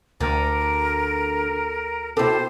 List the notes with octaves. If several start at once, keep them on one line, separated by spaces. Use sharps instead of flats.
D2 D3 A#4
B2 E4 G4 A4 C5